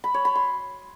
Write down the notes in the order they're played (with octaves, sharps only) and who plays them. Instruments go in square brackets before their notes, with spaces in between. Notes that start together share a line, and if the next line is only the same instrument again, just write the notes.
[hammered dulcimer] B5
C#5
B5
C6